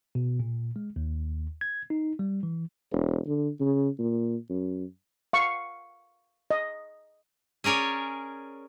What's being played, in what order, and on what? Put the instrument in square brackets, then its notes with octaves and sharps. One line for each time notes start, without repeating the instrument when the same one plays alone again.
[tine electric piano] B2
A#2
G#3
D#2
G#6
D#4
G3
E3
[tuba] E1
D3
C#3
A#2
F#2
[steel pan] F5 C#6
D#5
[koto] C#4 G#4 A#4 C#5 D5